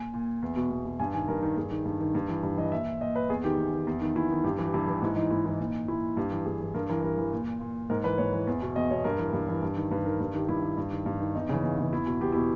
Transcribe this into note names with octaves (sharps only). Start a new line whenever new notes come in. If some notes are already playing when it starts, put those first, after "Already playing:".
Already playing: A#2 G#5
A#2
E2
B2
E2
B2
G2 G#5
D#3 G#5
G2 A#4
D#3
G2 G#4
D#3
G2
D#3
G2
E3
G2
E3 D#5
A#2 E5
A#2 D#5
B4
E2 G#4
D#3 G4
E2
D#3
E2
D#3
E2 E4
D#3
G2 G4
E3
G4
G2 E4
E3
G#2 E4
E3 D#4
G#2 E4
E3 E4
A#2 D#4
A#2 E4
G2 G4
E3
G2 G#4
E3
G2 A#4
E3 A#4
G2 A#4
E3
A#2
A#2
G#2 A#4
E3 B4
G#2 C#5
E3
E2
B2
E2 D#5
B2 C#5
G2 A#4
E3
G2
E3
G2
D#3
G2 B4
D#3 A#4
G2 A#4
D#3 G4
G2 E4
D#3
G2
D#3
G2
D#3
E2 D#4
C#3 E3
E2 D#4
C#3 E3
E2 E4
B2
E2 G4
B2 E4